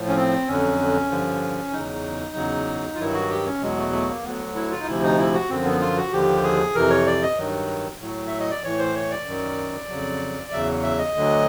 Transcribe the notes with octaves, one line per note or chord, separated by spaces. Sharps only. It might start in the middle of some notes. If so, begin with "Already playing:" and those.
Already playing: A2 F3
C#4
C4
F2 D3 F#3 C#4
G2 D3 F3
E2 C#3 F#3 D#4
E2 C#3 F#3
F4
G2 D#3 F#3 E4
F#4
G4
C#4
E2 B2 F#3 G#3
A3
A3
A#3
D2 D3 F#3 B3
E4
F4
D#4
D2 C3 F3 E4
D#4
E4
F#4
F#2 D3 F3 C4
B3
F4
F#4
D#2 D3 F3 G4
G#4
F2 C3 E3 A#4
C#5
D5
D#5
G2 D#3 F#3
A2 F#3
E5
D#5
D5
A2 E3 C#5
C5
C#5
D5
F#2 D#3 F#3
F2 C#3 F#3
E2 C#3 F#3 E5
E5
D#5
D2 D3 F#3